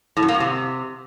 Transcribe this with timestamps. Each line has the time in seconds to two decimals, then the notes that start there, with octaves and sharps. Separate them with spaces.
0.17 A2
0.23 F#2
0.28 A#3
0.34 F#2
0.40 C3